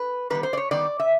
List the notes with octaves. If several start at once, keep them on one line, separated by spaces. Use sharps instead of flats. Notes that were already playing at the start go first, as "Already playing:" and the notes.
Already playing: B4
D#3 G3 B3 B4
C5
D5
C#5
D#3 G3 B3 D5
E5